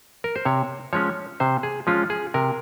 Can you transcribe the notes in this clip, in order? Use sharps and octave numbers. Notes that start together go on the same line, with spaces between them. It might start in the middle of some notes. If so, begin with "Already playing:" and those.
A#4
C5
C3 C#5
F3 G#3 C#4 C#5
C3 C5
G#4
F3 G#3 C#4 F4
G#4
C3 A#4